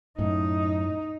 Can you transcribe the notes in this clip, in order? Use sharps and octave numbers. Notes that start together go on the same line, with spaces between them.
F#2 A2 D#4